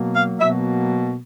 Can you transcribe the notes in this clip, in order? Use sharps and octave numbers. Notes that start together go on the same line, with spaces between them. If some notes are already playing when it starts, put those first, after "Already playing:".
Already playing: B2 F#3 A#3
F5
B2 F#3 A#3 E5